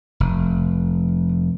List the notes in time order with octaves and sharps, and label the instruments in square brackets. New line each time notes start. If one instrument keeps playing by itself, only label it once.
[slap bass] F1